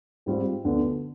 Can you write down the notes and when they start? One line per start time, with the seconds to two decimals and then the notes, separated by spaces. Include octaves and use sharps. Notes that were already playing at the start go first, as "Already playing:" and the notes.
0.26 G#2 G3 C4 F4
0.64 D2 D3 F3 B3